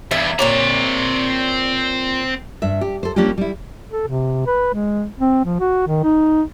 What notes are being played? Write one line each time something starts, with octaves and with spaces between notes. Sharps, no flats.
E2 G2 E5
A#2 C4 C#5 D5 A#5
G2 E5
G4
A4 C5
G3 A#3 C#4 D4 F4 G4
G3 E4
A4
C3
B4
G#3
C4
F3
F#4
D#3
D#4